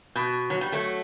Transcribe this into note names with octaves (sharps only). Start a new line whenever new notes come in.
B2
F#3
G3
F#3 A3